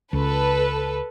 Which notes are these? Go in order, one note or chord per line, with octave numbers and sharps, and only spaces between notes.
C#2 A4 B4